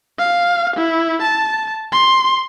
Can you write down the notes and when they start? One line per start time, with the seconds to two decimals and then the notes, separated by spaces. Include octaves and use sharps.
0.19 F5
0.76 E4
1.22 A5
1.92 C6